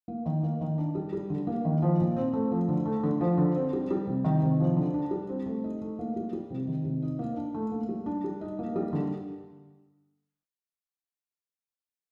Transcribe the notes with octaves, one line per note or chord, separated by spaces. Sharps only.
A#3
D#3
A#3
D#3
D4
G3
G3
D3
A#3
D#3
F3
A#2
C4
A3
F3
D3
A3
D3
F3
D3
C4
G3
G3
C3
D#3
C3
F3
D3
D4
G3
C4
A3
D#4
A3
A#3
G3
G3
C3
D#3
C3
D#4
A#3
D4
A3
A#3
G3
D4
G3
D#4
A#3
G3
D3